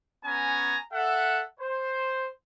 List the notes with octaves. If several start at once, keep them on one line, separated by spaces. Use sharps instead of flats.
B3 C#4 G#5 A#5
A4 E5 F#5
C5